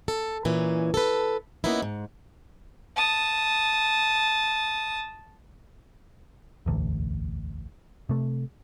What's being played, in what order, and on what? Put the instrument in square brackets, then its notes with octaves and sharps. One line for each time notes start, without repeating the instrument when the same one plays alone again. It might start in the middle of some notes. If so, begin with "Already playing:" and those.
[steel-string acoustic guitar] A4
A#2 E3 C#4
A4 B4
E3 A#3 B3 C#4 D#4 E4
G#2
[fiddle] A5 D#6
[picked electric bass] E1 A1 D2
C3 A3